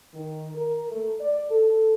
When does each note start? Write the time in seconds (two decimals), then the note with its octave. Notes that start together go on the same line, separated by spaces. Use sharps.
0.14 D#3
0.55 A#4
0.91 A3
1.20 D5
1.50 A4